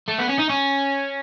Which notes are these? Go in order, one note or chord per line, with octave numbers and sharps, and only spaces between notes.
A3
B3
C#4
D#4
C#4